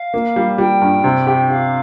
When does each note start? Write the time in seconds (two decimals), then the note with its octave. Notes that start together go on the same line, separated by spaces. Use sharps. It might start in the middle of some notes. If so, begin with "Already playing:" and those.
Already playing: F5
0.14 A#3
0.36 G3
0.58 G3 G5
0.82 G2
1.04 C3
1.27 G4
1.50 G4 F5